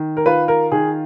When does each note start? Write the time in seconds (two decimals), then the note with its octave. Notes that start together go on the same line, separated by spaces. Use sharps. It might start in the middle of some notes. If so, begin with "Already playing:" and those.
Already playing: D#3
0.17 A#4
0.26 F4 B4
0.48 A#4
0.72 D#3 G#4